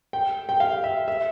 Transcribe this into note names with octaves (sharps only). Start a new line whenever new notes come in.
G5
G5
F5
E5
E5